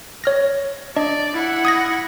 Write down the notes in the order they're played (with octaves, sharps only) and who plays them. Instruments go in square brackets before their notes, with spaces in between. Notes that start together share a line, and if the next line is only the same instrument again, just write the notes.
[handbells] C#5 F6 A#6
[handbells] D4 D#5 [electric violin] D5
[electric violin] E4 F#5
[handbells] D#6 G#6 A#6